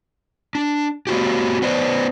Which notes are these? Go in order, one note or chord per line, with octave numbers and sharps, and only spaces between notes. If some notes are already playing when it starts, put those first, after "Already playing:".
D4
A#3 F#4 G4
B3 B4 C5 D5